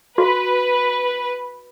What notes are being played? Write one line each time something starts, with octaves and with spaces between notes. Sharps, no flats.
F#4 B4